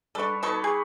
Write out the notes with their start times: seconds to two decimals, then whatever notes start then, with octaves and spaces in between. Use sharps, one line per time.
0.15 G3 D4 A4 B4 C#6
0.43 B2 D#4 A4 B4 C#5 C#6
0.64 G#4